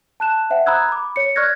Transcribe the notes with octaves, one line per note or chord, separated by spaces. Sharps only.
A5 F#6 E7
C5 E5 F#5 G5
A#5 B5 D#6 E6 F#6 G#6
B5 D6
C#5 C#7
D5 C#6 F6 F#6 G#6 A#6